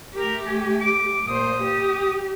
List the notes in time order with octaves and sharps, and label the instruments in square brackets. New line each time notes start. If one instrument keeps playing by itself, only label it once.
[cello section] A3 G4 [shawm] A#4
[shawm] G#5
D6
[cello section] A#2 C5 [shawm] D#6
[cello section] G4